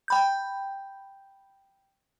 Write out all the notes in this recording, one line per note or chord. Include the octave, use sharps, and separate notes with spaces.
G5 B5 G6